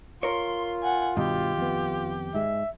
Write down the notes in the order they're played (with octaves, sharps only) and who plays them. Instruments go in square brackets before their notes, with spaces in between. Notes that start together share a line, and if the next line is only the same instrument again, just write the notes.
[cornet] F4 [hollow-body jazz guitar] A#4 C#5 [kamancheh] C6
[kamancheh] F#5 G#5
[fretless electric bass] G2 B2 [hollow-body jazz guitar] D#3 [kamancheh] G4
[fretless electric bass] F2 B3
[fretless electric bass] G#2 G#3 [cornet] E5